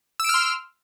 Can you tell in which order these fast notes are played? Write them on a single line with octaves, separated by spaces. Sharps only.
E6 D7 F6 C6